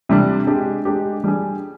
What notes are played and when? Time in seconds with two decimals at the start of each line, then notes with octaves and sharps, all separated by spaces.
0.09 C3 G3 D4
0.47 G#3 D4 G4
0.85 G#3 D4 G4
1.24 G3 D4 G#4